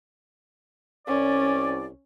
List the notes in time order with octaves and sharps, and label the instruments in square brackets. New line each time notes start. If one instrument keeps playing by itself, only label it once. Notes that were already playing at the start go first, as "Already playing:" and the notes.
[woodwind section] C2 D5 [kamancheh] C#4